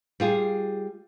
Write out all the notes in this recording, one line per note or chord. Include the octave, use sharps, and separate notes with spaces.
G3 F4 G#4